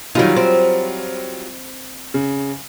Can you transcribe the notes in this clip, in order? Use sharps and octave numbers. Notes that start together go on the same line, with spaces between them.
D#3 F#3 G3 D#4 F4
C4
C#3